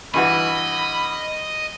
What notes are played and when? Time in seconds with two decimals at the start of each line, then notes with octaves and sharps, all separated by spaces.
0.14 G2 E3 F#4 D#5 B5